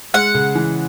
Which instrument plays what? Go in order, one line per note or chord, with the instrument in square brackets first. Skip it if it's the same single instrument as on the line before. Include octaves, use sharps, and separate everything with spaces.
[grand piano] G#3 [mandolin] F#5
[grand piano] C#3
E3